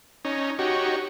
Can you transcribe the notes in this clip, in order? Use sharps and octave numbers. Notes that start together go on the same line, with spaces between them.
C#4 D#4
D#4 F#4 G4 C#5